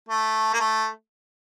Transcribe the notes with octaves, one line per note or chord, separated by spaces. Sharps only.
A3
A#3
A3